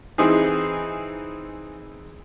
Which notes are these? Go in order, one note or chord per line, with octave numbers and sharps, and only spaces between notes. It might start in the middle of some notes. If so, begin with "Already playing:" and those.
E3 C4 D#4 G#4